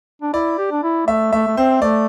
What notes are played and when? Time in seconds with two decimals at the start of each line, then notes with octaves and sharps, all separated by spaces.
0.22 D4
0.34 E4 D5
0.58 G4
0.72 D4
0.83 E4
1.07 A3 E5
1.32 A3 E5
1.47 A3
1.57 C4 C5
1.82 A3 D5